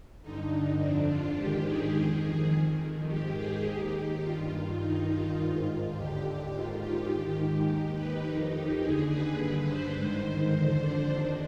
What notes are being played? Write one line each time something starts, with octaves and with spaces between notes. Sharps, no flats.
G2 D3 D#4
F2 D3 D4
F4
G#2 D#3 G4
G#4
F2 D#3
F2 D#3
G#2 D#3 G4
G#4
D#2 D#3 G4
G2 D#3 F4
F4
G2 D#3 D#4
F4
D#3
G#2
F4
D#2 D3 G4
G#2 D#3 F4
G4
G#2 D#3
G4
D#2 D#3
B4
F2 D#3 D#4
G4
D#2 D3 G#4
B4
G2 D3
C5
G#2 D#3
F2 D3 C5
D4
D#2 D#3 D4